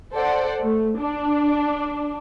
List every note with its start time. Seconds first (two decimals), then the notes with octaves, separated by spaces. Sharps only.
0.14 A4 C5 D5 F#5
0.62 A3
0.98 D4